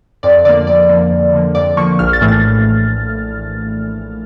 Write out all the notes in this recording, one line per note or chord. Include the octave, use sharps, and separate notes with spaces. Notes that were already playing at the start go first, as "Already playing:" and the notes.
F2 D5
D3 F3 A#3 D5
F2 D5
D3 F3 A#3
F2
D3 F3 A#3
F2 D5
D3 F3 A#3 C#6
A#1 F6
A6
A2 E3 A3
A6